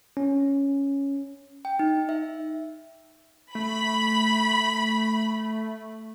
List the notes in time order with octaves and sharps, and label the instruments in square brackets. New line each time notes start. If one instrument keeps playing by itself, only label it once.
[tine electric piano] C#4
[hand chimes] G5
D#4
E5
[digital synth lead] A3 [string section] B5